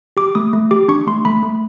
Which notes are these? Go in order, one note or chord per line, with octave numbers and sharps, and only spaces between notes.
G4 D6
A3 D#6
A3
G4 D6
D4 C#6
A3 C6
A3 B5
A3